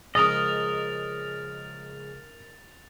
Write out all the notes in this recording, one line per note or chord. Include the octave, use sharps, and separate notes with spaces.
C#3 F3 G#3 A#4 D#5 D#6 A6 F7